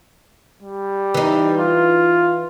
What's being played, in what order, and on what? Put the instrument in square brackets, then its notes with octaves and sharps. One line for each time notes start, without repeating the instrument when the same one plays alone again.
[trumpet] G3
[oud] E3 D#4
[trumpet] F4